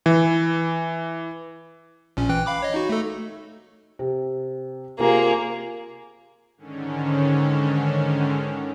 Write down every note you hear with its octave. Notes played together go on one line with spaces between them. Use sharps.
E3
A#1 A#2 C#4
E3 G5 F#6
F5 B5 D6
C#5 D#5
D#4 F#4
A3 A4
C3
C3 A#3 F4 G#4 A#4
G#2 D3 D#3 C#4